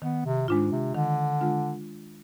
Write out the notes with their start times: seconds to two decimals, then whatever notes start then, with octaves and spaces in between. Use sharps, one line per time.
0.02 D#3 B3
0.26 C3
0.48 G#2 G#3 D4 F4
0.72 C3
0.95 D3 D#3
1.41 G#3 D4 F4